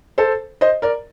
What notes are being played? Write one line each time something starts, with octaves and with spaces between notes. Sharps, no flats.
A4 C5
C5 D#5
A#4 D5